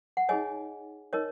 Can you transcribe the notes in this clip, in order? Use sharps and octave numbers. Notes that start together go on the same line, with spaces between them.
F#5
D#4 G#4 C#5 D#5 G#5
D#4 A#4 C#5 D#5